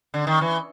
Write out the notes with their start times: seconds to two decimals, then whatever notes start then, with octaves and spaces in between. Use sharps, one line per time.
0.14 D3
0.27 D#3
0.41 E3